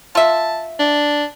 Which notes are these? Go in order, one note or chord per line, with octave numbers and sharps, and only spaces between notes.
F4 E5 A5
D4